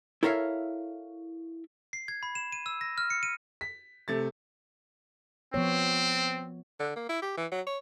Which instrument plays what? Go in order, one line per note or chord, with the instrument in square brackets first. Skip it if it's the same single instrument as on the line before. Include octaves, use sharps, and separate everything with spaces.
[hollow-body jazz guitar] E4 A4 A#4 C#5 E5 F5
[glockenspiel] C7
G#6
B5
E7
D#7
E6
A#6
F6
C#7
D#7
[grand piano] B6
C3 A3 A6
[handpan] F3 B3 C#5 [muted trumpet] C4
[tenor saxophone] D3
A#3
E4
G4
E3
F#3
C#5